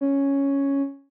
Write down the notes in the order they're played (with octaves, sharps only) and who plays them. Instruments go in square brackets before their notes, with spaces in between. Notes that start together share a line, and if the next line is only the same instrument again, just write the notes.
[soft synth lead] C#4